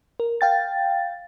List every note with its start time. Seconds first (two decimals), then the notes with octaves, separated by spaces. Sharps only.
0.20 A#4
0.41 F5 G5 A6